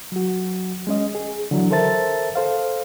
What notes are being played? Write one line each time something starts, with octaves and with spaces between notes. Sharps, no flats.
F#3 F#4
G#3 C#4 D#5
G#4
D3 E3 F#3
A4 A#4 C5 E5 A5 A6
A4 C5 F5